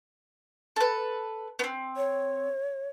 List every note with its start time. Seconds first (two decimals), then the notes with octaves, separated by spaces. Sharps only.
0.76 A4 B4
1.59 B3 C4
1.97 C#5